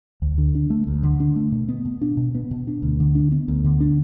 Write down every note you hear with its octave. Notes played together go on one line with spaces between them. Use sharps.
D2
D3
D4
A3
D2
D3
D4
A3
B2
B3
B2
D4
B2
B3
B2
D4
D2
D3
D4
B3
D2
D3
D4